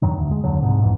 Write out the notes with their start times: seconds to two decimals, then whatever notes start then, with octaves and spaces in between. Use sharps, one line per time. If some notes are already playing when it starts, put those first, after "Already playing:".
0.02 E2 G2 D#3 F#3
0.18 D2
0.31 G#3
0.44 F#1 D#2 D3 F#3
0.60 C2 G#2 C3
0.81 F2 G#2 C#3 E3